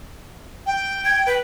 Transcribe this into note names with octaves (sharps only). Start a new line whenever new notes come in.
G5
G#6
B4